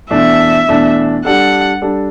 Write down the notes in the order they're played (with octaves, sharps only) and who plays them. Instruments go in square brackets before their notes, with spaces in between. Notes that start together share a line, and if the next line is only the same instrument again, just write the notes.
[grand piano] E2 B2 A3 D4 [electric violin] E5
[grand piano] E2 B2 A3 D4
[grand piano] G3 D4 A4 [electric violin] F#5
[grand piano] G3 D4 A4